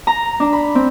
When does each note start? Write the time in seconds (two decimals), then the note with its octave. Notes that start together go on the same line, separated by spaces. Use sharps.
0.07 A#5
0.40 D4
0.53 B5
0.75 C4